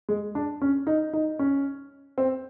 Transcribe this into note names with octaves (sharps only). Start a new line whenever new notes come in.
G#3
D4
C#4
D#4
D#4
C#4
C4